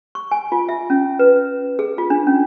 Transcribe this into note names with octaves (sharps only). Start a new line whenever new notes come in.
C#6
G#5
F4
E5
C#4
B4
G#4
F4
D4
C#4